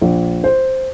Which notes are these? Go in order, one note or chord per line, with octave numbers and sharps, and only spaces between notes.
A#1
C5